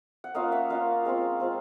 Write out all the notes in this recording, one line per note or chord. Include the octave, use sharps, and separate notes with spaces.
F#5
A#3 C#4 F4 D#5 F5
E5 F#5
A#3 C#4 F4 D#5 F5
G#3 C4 F4
G#3 C4 F4